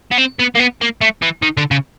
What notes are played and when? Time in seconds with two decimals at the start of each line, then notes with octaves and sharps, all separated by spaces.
0.12 B3
0.18 C4
0.39 B3
0.55 A#3
0.59 B3
0.81 A#3
1.01 A3
1.22 E3
1.43 D#3
1.57 D3
1.71 C#3